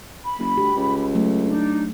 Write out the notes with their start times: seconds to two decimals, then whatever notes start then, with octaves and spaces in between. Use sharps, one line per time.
0.23 B5
0.39 F#1
0.57 D2 G4
0.76 C#2
1.15 F#3 A3
1.45 D4 D#4